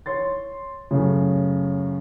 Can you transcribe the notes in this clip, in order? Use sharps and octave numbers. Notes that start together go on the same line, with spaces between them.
C#5 C6 A6
F#2 C#3 A3